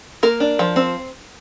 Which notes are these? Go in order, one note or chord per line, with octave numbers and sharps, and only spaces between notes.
A#3 A#4
D4
F3
C4